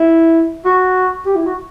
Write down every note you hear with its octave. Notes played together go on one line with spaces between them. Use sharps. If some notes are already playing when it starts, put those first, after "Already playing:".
Already playing: E4
F#4
G4
E4
F#4